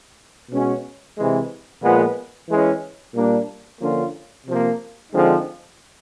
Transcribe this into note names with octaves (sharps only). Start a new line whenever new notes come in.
B2 G#3 C#4 F#4
C3 E3 G#3
A#2 F3 G#3 B3
E3 G#3 C#4
A#2 G3 A#3 D4
D3 F3 A#3 C#4 F4
C3 F3 A#3
D3 F3 G#3 C4 D#4